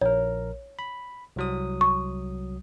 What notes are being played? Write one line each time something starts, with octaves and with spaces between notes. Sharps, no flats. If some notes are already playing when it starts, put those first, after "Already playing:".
A#1 A#4 C#5
B5
C2 F#3 D#6
C#6